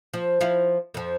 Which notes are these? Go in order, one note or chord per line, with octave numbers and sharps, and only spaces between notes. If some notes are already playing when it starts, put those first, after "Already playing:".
F3
F3 E4 F4
F2 F3